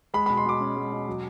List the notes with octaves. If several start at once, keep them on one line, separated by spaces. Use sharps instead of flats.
G#3 B5
B5
B2
C6
B2 D6
C#4
G#3
B2
F#3